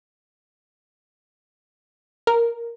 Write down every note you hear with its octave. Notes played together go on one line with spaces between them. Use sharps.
A#4